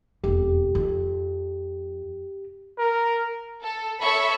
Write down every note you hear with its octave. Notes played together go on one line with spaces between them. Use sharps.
E1 F2 G4
F2
A#4
A4
A4 C#5 E5 B5 C#6